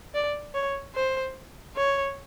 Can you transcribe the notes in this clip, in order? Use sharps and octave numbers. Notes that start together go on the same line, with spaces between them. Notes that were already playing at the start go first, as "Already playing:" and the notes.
D5
C#5
C5
C#5